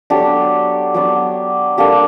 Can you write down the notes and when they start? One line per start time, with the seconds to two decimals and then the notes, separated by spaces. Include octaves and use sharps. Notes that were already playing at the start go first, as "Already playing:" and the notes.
0.10 F#3 B3 D4 G4 A4
0.94 F#3 B3 D4
1.78 G3 A#3 D4 G4 A4